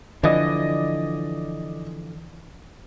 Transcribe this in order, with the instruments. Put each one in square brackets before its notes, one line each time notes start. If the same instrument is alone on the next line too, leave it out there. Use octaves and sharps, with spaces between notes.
[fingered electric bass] D3 E3 F3 [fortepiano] D5 D#5